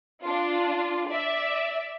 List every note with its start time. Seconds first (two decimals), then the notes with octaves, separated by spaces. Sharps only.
0.22 D4 F4
1.08 D5 E5